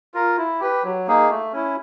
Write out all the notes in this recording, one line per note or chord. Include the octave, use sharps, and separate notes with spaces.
F4 A#4
E4
G4 B4
F#3
A#3 D#4 G#4
A3
C#4 E4